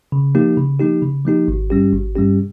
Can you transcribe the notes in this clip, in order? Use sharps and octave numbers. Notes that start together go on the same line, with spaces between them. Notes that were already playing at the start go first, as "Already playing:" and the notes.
C#3
F3 A#3 D#4 G4
C#3
F3 A#3 D#4 G4
C#3
F3 A#3 D#4 G4
G#1
G2 G3 C#4 G4
G#1
G2 G3 C#4 G4